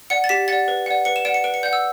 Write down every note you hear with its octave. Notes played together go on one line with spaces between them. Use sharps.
D5 F#5 C#7
A6
G4 B6
D5 F#5 A6
B4
D5 F#5
B4 C#7
E7
D5 F#5 D7
C#7
B4 D7
C#7
D5 F#5 G6
E6